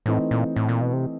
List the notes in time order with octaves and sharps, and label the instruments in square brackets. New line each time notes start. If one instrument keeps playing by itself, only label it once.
[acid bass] A2 [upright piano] E3 A3 C4 D#4
[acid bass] A#2
A2
A#2
B2
C3